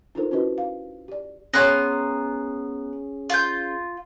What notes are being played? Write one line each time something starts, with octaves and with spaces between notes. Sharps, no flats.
D4 D#4 F4 A4 A#4 C5
C#4 E4 F#4 B4 D#5
F5
G4 D5
B3 C#4 G#4 C#5 A#5 C6 F#6 A#6
F4 G6